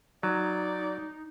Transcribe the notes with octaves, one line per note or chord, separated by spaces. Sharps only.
F#3 D#4 D5